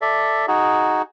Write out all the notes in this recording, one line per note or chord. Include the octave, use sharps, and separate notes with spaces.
A4 D5 E5
D#4 F#4 G#4